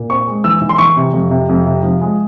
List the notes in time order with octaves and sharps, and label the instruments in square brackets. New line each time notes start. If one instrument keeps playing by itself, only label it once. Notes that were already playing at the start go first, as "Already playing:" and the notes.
Already playing: [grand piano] A#2
C4 C#6
G#3
E3 E6
E3
C6
E3 C#6
C3
F2
C3
F2
C3
F3
G#3